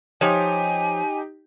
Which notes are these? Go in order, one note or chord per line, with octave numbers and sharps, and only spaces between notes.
F3 D#4 G4 C#5 G#5